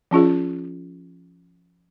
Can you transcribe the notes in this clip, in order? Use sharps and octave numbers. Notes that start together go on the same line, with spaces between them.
F3 C#4 F4 G#4